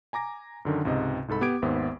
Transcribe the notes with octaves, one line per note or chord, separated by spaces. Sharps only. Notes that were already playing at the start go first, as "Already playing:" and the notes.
G#5 A#5 D6 A#6
F#2 D3 D#3
C#2 G#2 C3 D#5
C2 G#2 A4 B5
B3 G4 D6 G#6 D7
G#1 D#2 B3 C5 E5